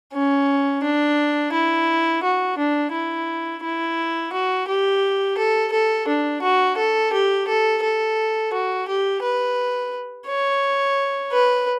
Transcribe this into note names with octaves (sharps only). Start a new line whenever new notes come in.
C#4
D4
E4
F#4
D4
E4
E4
F#4
G4
A4
A4
D4
F#4
A4
G4
A4
A4
F#4
G4
B4
C#5
B4